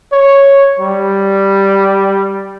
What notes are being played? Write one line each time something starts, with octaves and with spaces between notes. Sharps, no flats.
C#5
G3